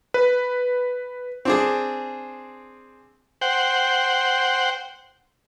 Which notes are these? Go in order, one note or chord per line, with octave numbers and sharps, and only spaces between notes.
B4
C4 D4 G#4
C5 F#5 G5